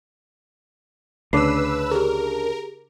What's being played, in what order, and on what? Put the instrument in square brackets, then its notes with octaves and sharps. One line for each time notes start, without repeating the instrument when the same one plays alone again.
[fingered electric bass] D2 [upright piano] C#3 D4 [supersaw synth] B4 E6 [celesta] D6 C7
[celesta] G4 G#4 [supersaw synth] A#4